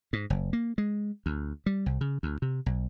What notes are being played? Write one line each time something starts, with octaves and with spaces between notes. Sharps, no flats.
G#2
F#1
A#3
G#3
D2
G3
C2
C#3
D2
C3
B1